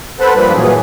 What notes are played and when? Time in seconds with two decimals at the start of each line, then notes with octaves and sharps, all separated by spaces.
0.20 A4 B4 C5 F#5 A5 B5
0.35 G2 F3 G3 A#3 B4 B5
0.55 A#2 E3 F#3 G#4